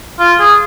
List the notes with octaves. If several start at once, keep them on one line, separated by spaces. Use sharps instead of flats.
F4
G#4